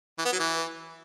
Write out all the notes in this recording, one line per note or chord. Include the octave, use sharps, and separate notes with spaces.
E3
B3
F#3
E3